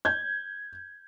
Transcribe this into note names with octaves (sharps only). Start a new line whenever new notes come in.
G6 G#6